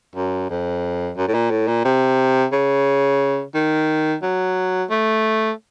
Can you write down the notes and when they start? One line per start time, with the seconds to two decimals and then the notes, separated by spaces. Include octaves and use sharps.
0.15 F#2
0.49 F2
1.17 F#2
1.28 A2
1.34 A#2
1.50 A2
1.68 A#2
1.84 C3
2.52 C#3
3.54 D#3
4.22 F#3
4.90 A3